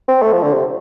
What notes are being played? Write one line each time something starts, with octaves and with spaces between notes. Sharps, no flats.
C4
A3
F3
D3
C3